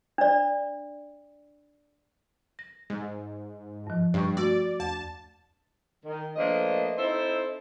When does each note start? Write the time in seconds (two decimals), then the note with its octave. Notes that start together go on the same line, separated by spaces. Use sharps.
0.18 D4 D5
2.59 A#6
2.90 G#2
3.87 G2 F3
4.14 G2 D5 C#6
4.37 A3 F#4 D5
4.80 E2 A5
6.04 D#3
6.36 F3 A3 A#3 D4 B4 D#5
6.98 C4 D#4 E4 A4 C5